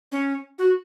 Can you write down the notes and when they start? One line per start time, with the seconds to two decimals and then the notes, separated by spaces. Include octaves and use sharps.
0.12 C#4
0.59 F#4